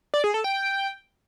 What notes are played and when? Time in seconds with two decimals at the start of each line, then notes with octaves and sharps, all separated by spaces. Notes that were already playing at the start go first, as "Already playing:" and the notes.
0.14 D5
0.24 G#4
0.34 A4
0.44 G5